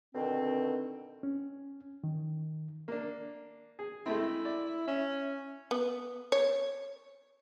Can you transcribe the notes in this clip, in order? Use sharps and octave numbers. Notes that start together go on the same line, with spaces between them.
B2 D3 D#3 C4
C#4
D#3
A#3 D4
G#4
G#3 A3 C4 E4
D5
C#4 E5
B3
C#5